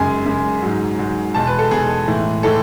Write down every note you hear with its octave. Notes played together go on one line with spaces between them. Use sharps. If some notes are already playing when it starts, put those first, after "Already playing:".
Already playing: F#2 C#3 G#3 G#5
F#2 C#3 G#3
G#2 F#3
G#2 F#3
E2 B2 G#3 A5
B4
A4
E2 B2 G#3 G#4
A2 E3 G#3
A2 E3 G#3 A4